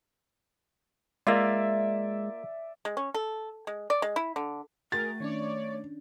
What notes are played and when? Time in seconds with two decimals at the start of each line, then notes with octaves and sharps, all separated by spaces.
1.27 G#3 A#3 F4 D5 E5
2.85 G#3
2.97 C#4
3.14 A4
3.67 G#3
3.90 D5
4.02 G#3
4.16 E4
4.36 D3
4.92 A3 F#4 G#4 A#4 G5 A6
5.20 D#3 C#4 D4 C#5 D5